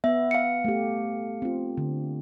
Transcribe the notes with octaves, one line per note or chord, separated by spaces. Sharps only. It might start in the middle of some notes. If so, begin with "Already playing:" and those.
B3 E5
F5 C#7
A3 G4
C4 F4
D3